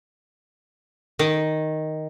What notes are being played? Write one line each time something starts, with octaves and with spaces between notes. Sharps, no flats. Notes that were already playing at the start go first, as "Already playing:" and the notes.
D#3